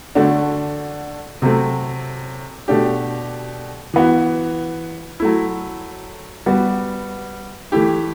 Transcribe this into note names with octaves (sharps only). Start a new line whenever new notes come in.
D3 A3 D4 F#4
C3 F#3 A3 C4
B2 A3 D4 G4
E3 B3 F#4
F#3 A3 E4
G3 B3 F#4
E3 A3 E4 G4